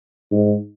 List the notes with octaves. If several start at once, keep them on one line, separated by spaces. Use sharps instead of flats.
G#2